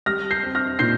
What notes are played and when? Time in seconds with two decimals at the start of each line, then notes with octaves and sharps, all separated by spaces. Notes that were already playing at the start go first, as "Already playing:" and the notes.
0.06 G3 F6 A#6
0.31 G6 C7
0.43 C4
0.55 F6 A#6
0.79 A#2 G6 C7